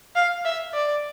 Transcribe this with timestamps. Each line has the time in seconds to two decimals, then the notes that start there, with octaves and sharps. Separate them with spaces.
0.15 F5
0.45 E5
0.74 D5